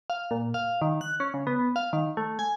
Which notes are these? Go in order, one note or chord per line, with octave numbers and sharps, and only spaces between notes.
F5
A#2
F5
D#3
F#6
C#4
C#3
B3
F5
D#3
A3
G#5